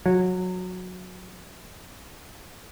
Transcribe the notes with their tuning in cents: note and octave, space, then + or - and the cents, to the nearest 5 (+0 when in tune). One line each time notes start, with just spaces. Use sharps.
F#3 -20